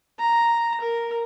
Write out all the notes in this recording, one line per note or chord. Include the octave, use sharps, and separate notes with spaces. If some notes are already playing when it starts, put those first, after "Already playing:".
A#5
A#4